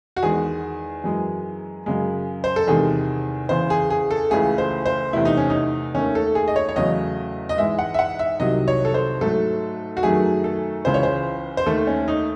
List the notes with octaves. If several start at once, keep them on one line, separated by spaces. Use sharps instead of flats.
F#4
E2 D#3 G#3 G#4
F#2 E3 G#3
F#2 C#3 G#3
C5
A4
E2 C3 D#3 G#3 G#4
E2 C#3 E3 C5
G#4
G#4
A4
C#2 C#3 E3 A3 G#4
C5
C5
E2 C3 E3 A3 E4
D#4
C#4
D#4
D#2 D#3 A3 C#4
A4
G#4
D#5
C#5
C#5
E2 C#3 F#3 A3 D#5
D#5
G#2 E3 G#3 E5
F#5
E5
F#5
E5
C2 C3 D#3 F#3 D#5
C#5
A4
C5
G#2 F#3 A3 A4
F#4
F#2 D#3 F#3 A3 G#4
A4
C#2 C#3 E3 G#3 C5
C#5
C5
C5
D#2 D#3 A3 A4
C#4
D#4